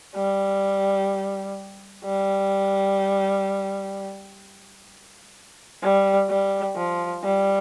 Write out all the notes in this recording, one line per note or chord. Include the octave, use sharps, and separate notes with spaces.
G3
G3
G3
G3
F3
G3